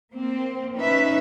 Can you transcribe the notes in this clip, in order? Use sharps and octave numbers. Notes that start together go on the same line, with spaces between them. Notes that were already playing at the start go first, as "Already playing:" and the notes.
A#3 C4
C#4 D#4 B4 E5